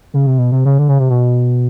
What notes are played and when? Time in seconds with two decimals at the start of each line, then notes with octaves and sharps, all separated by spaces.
0.14 C#3
0.27 C3
0.38 B2
0.52 C3
0.65 C#3
0.79 D3
0.89 C#3
1.00 C3
1.10 B2